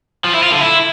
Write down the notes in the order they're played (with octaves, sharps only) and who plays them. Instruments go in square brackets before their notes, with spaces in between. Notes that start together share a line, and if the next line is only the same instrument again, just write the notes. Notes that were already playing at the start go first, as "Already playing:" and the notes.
[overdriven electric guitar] F3
E4
F4
D3
E4